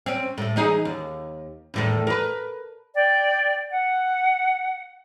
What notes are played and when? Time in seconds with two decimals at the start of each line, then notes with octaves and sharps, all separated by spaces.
0.06 C4 C#4
0.38 A2 A3
0.56 E3 D#4 G#4
0.85 D#2
1.74 E2 A2 D#3
2.07 A#4 B4
2.95 D5 G5
3.71 F#5